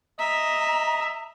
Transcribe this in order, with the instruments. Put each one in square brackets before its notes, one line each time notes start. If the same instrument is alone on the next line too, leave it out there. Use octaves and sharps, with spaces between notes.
[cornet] D#5 [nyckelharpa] E5 [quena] A#5